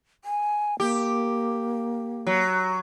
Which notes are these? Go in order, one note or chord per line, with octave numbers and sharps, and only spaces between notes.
G#5
A#3 G4
F#3